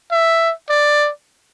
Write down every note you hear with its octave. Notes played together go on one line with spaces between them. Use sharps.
E5
D5